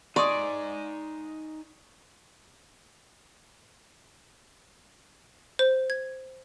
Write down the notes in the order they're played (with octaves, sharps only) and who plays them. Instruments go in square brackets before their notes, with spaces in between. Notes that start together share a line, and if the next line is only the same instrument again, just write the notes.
[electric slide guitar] D#4 D#5 G#5 [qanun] D5 [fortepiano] C6 C#6 D#6
[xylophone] C5
G#6